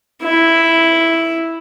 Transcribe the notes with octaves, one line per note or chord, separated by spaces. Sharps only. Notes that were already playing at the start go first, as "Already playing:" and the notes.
E4